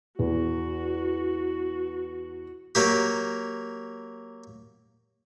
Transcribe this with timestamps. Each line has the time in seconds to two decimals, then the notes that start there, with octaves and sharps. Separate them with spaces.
0.19 E2 F#4
2.75 F#3 A#3 G4